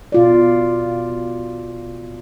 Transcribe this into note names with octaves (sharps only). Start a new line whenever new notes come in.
B2 F4 D5